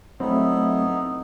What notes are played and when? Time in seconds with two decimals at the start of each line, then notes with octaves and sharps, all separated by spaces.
0.20 F#3 A3 B3 C4 D#4 E4